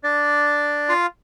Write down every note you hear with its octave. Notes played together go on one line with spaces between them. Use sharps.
D4 D5
F4 F5